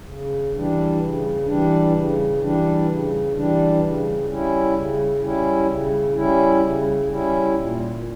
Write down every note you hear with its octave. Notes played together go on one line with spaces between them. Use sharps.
C#3
E3 G3 D4
C#3
E3 G3 D4
C#3
E3 G3 D4
C#3
E3 G3 D4
C#3
G3 C#4 E4
C#3
G3 C#4 E4
C#3
G3 C#4 E4
C#3
G3 C#4 E4
A#2